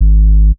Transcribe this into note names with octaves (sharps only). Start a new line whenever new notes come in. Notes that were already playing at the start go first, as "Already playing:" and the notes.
G#1